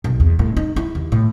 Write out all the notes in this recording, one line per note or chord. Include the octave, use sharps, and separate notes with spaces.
B1
E2
A2
D#4
E4
D#2
A2